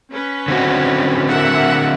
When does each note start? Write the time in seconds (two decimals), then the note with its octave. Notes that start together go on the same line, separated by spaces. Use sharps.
0.12 C#4 B4
0.48 D3 C4 F#4
1.28 A#4 E5 F#5